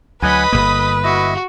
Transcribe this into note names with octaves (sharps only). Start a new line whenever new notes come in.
D2 F#3 B4 D#5 F#5 G#5 B5
G1 F2 A#3 D#6
E4 F#4 D#5 E5